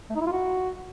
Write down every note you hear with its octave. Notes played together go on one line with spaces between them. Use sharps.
A3
D#4
E4
F4
F#4